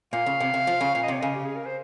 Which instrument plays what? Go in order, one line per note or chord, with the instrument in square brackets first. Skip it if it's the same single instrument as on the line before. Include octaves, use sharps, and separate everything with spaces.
[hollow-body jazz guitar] A#2 [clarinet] F5
[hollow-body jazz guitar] C#3
C3
C3
F3
C#3
[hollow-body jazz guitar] A#2 [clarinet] F5
[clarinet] D#5
[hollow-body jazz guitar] C3 [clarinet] C#5
[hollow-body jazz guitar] C#3 [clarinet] D#5
[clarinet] G4
G#4
A#4
C5